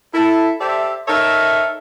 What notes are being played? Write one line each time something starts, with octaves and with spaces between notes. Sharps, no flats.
E4 A4
G4 A4 C5 D5 E5
D#4 A4 A#4 C#5 E5